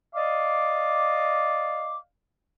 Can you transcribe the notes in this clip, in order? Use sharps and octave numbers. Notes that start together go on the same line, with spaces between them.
D5 D#5 F5 D6